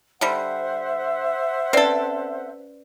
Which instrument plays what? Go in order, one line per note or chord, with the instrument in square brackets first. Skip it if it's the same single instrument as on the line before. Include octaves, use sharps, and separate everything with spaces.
[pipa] D3 G3 [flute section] C5 E5 F#5
[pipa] C4 A4 [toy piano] C#4 B4 D5